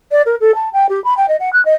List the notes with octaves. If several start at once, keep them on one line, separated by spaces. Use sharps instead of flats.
D5
A#4
A4
A5
G5
G4
B5
G5
D#5
F#5
F#6
D#5